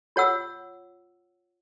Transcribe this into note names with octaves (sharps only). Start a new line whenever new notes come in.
F4 C#5 F#5 E6